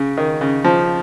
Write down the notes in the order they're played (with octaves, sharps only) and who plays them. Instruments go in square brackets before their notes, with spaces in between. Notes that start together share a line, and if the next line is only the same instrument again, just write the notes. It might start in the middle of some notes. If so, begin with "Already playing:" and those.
Already playing: [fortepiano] C#3
D#3
C#3
F3